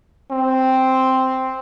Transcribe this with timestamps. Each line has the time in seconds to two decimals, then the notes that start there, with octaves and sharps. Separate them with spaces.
0.31 C4